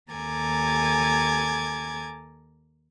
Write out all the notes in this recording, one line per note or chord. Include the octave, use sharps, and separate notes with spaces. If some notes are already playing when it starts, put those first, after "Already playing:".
D#2 A4 G#5 A#5 D6 G#6